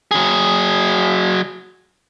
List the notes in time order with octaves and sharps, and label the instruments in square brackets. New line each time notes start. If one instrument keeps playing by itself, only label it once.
[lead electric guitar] F#3 G#4